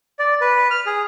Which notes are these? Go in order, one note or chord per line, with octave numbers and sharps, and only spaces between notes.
D5
B4
F6
G#4